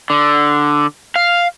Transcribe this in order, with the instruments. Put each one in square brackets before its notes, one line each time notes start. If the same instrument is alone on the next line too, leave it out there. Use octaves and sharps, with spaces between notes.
[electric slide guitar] D3
F5